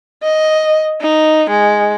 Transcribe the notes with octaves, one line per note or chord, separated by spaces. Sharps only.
D#5
D#4
G#3